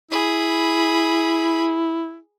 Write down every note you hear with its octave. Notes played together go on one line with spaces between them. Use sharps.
E4 G#4 B5